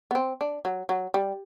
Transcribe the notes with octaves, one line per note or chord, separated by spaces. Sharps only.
B3
C4
D4
F#3
F#3
G3